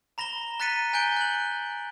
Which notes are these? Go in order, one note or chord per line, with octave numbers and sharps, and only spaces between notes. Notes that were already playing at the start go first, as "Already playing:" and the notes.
A#5 B5 A#6 E7 G7
A#5 F#6 A6 B6 C#7 D#7
G#5 F#6 G6 D7 G7
F#6 F#7